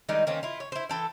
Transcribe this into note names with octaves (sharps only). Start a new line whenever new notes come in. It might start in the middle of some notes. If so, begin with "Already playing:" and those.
D#3 G3 G#3 D#4
D#3 A#3 C4 C#4
E4 F4
C#5
E4 C5
E3 A4 G5